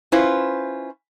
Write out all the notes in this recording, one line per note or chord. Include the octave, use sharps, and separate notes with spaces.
C#4 E4 F4 B4 C5